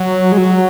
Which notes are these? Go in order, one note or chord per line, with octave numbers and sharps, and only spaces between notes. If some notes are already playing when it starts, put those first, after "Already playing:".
Already playing: F#3
G#3
F#3